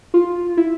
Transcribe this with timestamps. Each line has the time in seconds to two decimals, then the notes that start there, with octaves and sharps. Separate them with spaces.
0.14 F4
0.57 E4